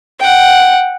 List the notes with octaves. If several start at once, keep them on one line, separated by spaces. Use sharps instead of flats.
F#5 G5